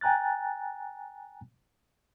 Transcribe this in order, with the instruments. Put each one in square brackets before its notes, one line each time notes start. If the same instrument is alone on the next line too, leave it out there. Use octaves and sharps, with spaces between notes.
[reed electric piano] G5 G#5 A#5 F#6 A6